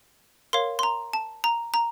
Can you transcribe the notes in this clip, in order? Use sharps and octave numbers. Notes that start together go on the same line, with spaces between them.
A#4 C#5 F5 C6
C6
A#5
A5
A#5
A#5